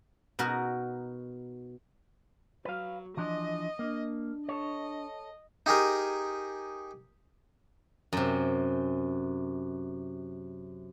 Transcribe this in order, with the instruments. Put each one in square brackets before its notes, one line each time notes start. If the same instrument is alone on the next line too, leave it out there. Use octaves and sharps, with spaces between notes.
[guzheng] B2 D#4 F#4 A#4
[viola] F#3 [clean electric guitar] B4 F5
[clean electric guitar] E3 F3 D4 [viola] D#5
[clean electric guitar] A#3 [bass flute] D4
[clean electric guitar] A4 C#5 [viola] D#5
[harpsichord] D#4 G4 G#4 A#4
[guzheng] F#2 C3